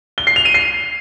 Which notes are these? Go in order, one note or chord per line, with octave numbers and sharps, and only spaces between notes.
G7
C7
F7
D#7
C7